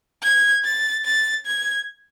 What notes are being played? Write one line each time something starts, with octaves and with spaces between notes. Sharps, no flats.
G#6
A6
A6
G#6